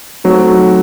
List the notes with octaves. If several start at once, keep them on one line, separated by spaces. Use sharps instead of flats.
F#3 A3 C4 D#4 F#4